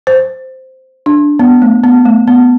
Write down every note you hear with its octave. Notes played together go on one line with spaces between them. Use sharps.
C5
D4
B3
A3
B3
A3
B3